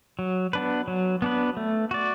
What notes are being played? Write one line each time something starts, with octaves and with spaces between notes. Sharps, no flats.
F#3
B3 D4 B4
F#3
B3 D4 B4
A3
F#4 D5